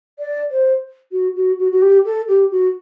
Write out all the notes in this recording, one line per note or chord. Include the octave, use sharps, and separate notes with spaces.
D5
C5
F#4
F#4
F#4
F#4
G4
A4
G4
F#4